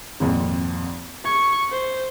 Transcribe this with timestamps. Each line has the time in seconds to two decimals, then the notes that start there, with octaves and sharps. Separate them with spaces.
0.20 G#1 F2 A#2
1.25 C#6 G#6
1.71 C5